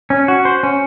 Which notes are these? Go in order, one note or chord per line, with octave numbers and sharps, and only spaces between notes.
C#4
F#4
C5
C#4